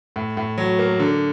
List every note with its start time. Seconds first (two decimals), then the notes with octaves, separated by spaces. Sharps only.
0.16 A2
0.37 A2
0.58 F#3
0.79 A#3
0.99 D3